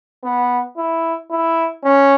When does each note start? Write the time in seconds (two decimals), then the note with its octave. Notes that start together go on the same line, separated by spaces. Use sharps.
0.24 B3
0.77 E4
1.31 E4
1.84 C#4